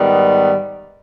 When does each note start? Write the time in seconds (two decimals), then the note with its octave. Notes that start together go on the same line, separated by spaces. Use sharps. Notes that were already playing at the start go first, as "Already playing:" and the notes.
Already playing: G#2 D#3 G3 B3